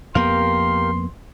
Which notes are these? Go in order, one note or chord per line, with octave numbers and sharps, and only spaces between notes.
F2 A#3 B3 G4 A#4 F5 C6